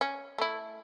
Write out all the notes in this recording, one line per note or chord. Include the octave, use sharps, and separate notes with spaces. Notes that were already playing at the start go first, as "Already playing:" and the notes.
C#4
A3 E4